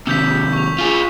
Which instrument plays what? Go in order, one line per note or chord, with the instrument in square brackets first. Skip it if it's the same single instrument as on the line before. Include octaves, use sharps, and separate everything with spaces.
[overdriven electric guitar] D#2 C3 [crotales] E6 G6 B6
[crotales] C#6 F7
[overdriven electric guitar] F4 G#4